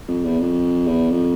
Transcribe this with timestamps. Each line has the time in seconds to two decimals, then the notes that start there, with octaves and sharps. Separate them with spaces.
0.08 F2
0.24 E2
0.40 F2
0.87 E2
1.10 F2